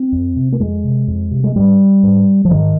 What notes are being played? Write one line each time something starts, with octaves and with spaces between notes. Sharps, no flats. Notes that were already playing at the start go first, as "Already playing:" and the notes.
Already playing: C4
F2
C3
A#3
F2 G#3
C3
F2
C3
G#3
G#2 G3
G#2
F3
G#2 D#3